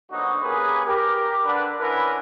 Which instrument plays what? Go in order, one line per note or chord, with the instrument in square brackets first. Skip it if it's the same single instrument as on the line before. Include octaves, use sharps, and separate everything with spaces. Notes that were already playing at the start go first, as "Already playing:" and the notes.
[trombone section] A#1 B2 D3 F#3 D#4 F#4
A#3 C#4 G4 G#4 A#4 B4
G4 A#4
D3 D4 B4
D3 C#4 E4 A#4 B4